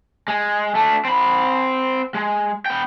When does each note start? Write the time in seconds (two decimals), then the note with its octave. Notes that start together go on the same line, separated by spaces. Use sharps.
0.28 G#3
0.75 A3 D4
1.05 C4 B5
2.14 G#3
2.66 B3 G5